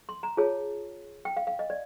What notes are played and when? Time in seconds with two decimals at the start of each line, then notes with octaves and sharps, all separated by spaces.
0.09 C6
0.23 A#5
0.37 F4 G#4 C#5 A5
1.25 G5
1.37 F5
1.47 F5
1.59 D#5
1.70 D5